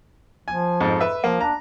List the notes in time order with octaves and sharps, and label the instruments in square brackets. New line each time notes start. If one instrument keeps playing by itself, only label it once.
[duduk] F3 [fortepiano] G#5
[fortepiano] F2 G#2
B4 E5
[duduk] F3 [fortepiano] A#3
[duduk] D4 [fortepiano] A#5